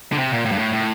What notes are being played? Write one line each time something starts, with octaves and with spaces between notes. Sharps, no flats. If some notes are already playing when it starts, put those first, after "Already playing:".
D3
C3
A#2
A2
G2
A2
A2